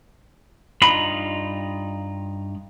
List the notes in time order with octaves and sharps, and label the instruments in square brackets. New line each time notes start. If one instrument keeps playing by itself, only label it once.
[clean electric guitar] G2 D#4 F4 B5